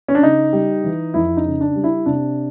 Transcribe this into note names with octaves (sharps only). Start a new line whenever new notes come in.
C#4
D4
C#3 D#4
G3
E3
F2 E4
D#4
C#3
D4
G3
E4
C3 D4